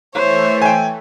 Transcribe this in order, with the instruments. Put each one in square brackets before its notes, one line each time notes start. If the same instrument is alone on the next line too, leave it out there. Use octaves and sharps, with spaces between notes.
[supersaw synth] E3 A3 [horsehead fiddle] C5 [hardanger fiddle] C#5 E5
[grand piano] G5 G#5